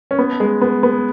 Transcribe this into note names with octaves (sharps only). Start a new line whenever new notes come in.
C#4
B3
G#3
B3
B3